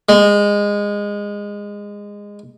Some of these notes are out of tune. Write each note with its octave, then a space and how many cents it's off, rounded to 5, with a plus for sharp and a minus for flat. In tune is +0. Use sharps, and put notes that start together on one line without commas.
G#3 -20